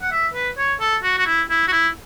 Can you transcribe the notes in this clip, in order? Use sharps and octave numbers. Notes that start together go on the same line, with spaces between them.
F#5
E5
B4
C#5
A4
F#4
F#4
E4
E4
F#4
E4